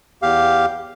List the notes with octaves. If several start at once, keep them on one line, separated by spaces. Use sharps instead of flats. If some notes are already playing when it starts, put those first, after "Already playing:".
E2 G4 F5